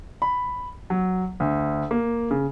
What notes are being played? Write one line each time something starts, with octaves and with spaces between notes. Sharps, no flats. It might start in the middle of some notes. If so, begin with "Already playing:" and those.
B5
F#3
D2
A#3
C#3